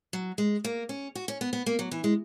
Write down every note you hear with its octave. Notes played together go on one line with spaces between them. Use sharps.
F#3
G#3
A#3
C#4
F#4
C#4
B3
B3
A#3
F#3
E3
G#3